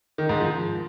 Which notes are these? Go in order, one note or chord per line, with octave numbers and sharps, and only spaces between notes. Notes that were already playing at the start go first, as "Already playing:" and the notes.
D#3
G#2
F3